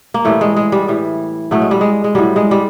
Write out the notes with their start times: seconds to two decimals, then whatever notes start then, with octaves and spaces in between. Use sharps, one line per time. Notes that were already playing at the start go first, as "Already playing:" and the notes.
0.14 A#3
0.25 A2 E3 G3 A3
0.41 G#3
0.56 G#3
0.72 G3
0.88 A2 E3 G3
1.51 A2 F#3 A3
1.62 G#3
1.71 G3
1.81 G#3
2.04 G#3
2.15 A2 F#3 G3
2.36 G#3
2.51 G3